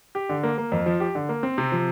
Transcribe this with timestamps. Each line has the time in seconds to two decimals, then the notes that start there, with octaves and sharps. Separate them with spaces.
0.15 G4
0.29 D3
0.43 A#3
0.58 A#3
0.72 F2
0.86 F3
1.00 G4
1.15 D3
1.29 A#3
1.43 C4
1.58 C3
1.72 F3